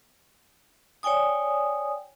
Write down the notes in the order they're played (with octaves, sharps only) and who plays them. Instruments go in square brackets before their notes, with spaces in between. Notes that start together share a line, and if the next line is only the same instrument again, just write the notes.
[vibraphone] C#5 D5 G5 G#5 D#6